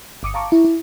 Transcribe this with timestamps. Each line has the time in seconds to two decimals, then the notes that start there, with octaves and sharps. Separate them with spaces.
0.23 G1 D6 D#6 C#7
0.34 F5 A5 A#5 C#6 D6
0.52 E4
0.64 E4